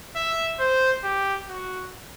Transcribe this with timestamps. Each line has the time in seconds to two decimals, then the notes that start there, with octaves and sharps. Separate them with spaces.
0.16 E5
0.60 C5
1.04 G4
1.49 F#4